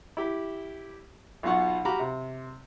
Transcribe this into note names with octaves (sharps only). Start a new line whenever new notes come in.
E4 G4
B1 B2 F4 F5 F#5 C#6
F#4 G4 F5 A#5 B5
C3